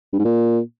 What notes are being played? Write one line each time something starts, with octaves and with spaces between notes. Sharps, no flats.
G2
G#2
A#2